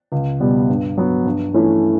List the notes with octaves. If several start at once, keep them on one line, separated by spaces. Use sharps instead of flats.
C#2
B2 G3 B3
G2
F#3 B3
G2
E3 A3 C#4 E4